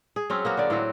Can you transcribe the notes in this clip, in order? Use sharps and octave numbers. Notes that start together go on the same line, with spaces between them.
G#4
F#3 C4 C#4
A#3 B3 F#4
D3 D5
A2 F#3 C4 F#4